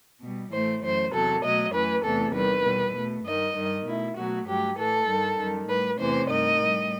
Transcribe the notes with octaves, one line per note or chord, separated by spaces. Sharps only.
B2 G3
A2 E3 A3 C5
F#2 E3 A3 C5
E2 C3 F#3 A4
B2 F#3 A3 D#5
F#2 E3 A3 B4
E2 C3 E3 A3 A4
E2 D#3 G3 B4
B2 G3
B2 A3
G2 D#3 G3 D#5
G2 D#3 G3
B2 A3 E4
B2 F#3 A3 F#4
G2 F#3 A3 G4
A2 E3 A3 A4
G2 D#3 G3
F#2 D#3 G3
A2 G3 B4
E2 C3 E3 A3 C5
G2 D#3 A3 D#5
A2 G3